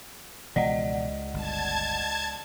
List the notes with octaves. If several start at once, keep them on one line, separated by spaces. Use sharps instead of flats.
C#2 B2 E3 F3 D5 D#5 F#5
G1 A5 G#6